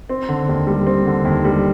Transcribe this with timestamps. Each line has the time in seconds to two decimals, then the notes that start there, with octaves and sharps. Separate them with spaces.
0.09 C4
0.29 D3
0.49 D#2
0.67 G3
0.87 C4
1.06 D3
1.25 D#2
1.45 G3